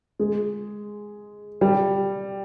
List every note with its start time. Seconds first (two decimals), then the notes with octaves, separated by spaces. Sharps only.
0.19 G#3
1.61 G3